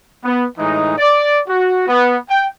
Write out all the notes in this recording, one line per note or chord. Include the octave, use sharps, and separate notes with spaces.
B3
A2 E3 G#3 D#4
D5
F#4
B3
G5